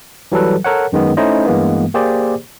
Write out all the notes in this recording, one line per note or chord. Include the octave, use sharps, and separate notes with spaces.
E3 F#3 G3 A4 B4
A4 A#4 C#5 F#5
F#2 D#3 G#3 B3
A3 C#4 D#4 E4 C5 D#5
G2 E3 G#3 A#3 B3
A#3 G4 G#4 C5 D5